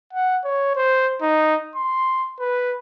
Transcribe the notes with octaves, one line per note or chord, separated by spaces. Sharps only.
F#5
C#5
C5
D#4
C6
B4